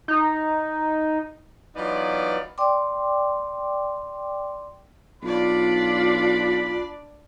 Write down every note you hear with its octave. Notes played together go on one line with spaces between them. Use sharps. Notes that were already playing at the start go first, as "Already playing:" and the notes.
D#4
E3 F#3 B3 D#4 F4 D5
D5 G5 C6 D6
B1 D4 F4 D5 B5